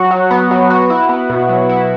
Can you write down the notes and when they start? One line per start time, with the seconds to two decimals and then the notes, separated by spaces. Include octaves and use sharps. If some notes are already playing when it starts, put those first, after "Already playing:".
Already playing: F#3 F#4
0.11 F#3
0.31 B3
0.51 F#3
0.70 F#4
0.90 E4
1.09 B3
1.30 B2
1.49 F#3
1.69 E4